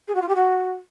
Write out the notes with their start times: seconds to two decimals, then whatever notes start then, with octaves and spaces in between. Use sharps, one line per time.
0.08 G#4
0.15 F#4
0.22 F4
0.29 G4
0.35 F#4